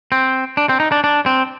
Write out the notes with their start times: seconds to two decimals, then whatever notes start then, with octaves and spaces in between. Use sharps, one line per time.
0.12 C4
0.57 D4
0.69 C4
0.80 D#4
0.92 D4
1.04 D4
1.26 C4